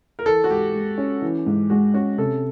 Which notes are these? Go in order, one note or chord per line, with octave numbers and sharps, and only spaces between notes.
A#4
E3 A4
F#4
G#2 G4
G#3
C#4
E3
G#2
G#3 F#4
C#4 F#4
C3 A4